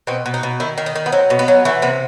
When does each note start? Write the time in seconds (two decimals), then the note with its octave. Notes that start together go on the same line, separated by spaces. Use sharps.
0.07 B2 C4
0.26 B2
0.34 D#4
0.43 B2
0.60 D#3 E4
0.78 D#3
0.86 D#4
0.95 D#3
1.06 B3
1.12 F#3 C4
1.30 B2
1.39 B3
1.48 F#3
1.65 E3 A3
1.82 C3 B3